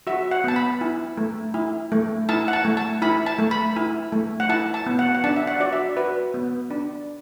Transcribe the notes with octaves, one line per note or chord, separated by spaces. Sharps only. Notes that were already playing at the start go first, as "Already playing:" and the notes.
F#4 E5
F#5
B3 A5
B5
E4
A3
E4
A3
E4 A5
F#5
A5
A3
A5
E4 B5
A5
A3
B5
E4
A3
F#5
E4 A5
A5
B3
F#5
F#5
D4 A5
E5
F#5
F#4 D5
E5
F#4 B4
B3
D4